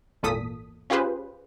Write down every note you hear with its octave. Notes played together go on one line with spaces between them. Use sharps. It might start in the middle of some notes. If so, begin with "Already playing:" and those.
G#1 E2 A#2 A4 D#6 B6
C#4 F4 G4 G#4 B4 C5